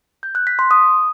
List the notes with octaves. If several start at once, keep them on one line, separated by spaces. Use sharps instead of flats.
G6
F#6
B6
C6
D#6